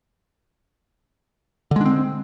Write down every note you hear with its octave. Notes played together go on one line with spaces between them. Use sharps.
D3 G#3 C4 D4